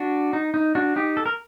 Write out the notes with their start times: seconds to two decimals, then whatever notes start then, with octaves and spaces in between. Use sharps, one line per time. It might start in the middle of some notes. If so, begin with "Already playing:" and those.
Already playing: D4 F#4
0.33 D#4
0.54 D#4
0.75 D4 F#4
0.96 D#4 G4
1.17 A4
1.26 A#4